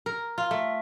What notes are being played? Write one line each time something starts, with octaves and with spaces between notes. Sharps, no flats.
A#4
F4
A3